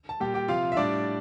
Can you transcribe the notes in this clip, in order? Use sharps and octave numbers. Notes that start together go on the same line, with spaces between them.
A5
A#2 G3 G4 G5
G4 G5
C3 F3 F4 F5
E5
A2 G3 D4 D5